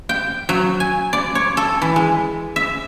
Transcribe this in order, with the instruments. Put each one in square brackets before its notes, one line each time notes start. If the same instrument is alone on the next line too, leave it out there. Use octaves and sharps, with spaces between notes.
[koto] G5
F#3
G#5
D5
C#5
A4
E3
G#3
E5